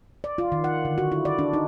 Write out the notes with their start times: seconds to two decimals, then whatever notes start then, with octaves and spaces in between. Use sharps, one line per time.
0.24 D5
0.38 F4
0.52 D#3
0.64 F#5
0.85 D3
0.98 F#4
1.12 E4
1.25 D5
1.39 D4
1.53 D#4